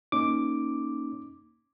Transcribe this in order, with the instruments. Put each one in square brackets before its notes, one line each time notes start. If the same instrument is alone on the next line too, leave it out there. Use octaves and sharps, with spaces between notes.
[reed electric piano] A#3 C#4 D#4 [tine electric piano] D6